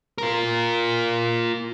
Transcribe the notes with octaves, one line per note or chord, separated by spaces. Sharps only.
F4 A#4